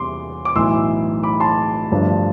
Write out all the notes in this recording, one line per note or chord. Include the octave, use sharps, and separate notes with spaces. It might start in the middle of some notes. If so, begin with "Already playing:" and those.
Already playing: E2 C3 G3 C6 D6
D6
B1 A2 E3 C6 E6
B5 D6
A5 C6
G1 G2 F3 A3 D4